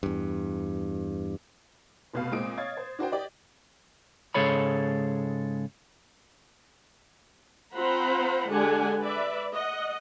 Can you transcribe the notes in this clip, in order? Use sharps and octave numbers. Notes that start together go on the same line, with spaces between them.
E2 G2
F1 B2 F5
A#2 G#3 C4 D#6 D7
C#5 D#5 F5 D#6 G#6 A6
C5
D4 F#4 C5 G5
G4 D5 D#5
G#2 C#3 G#3 A4 C#5 B5
C4 F4 C5 F#5 A#5 B5
D3 G#3 D4 G4 F#5 G#5
B4 D5 E5
D#5 F#5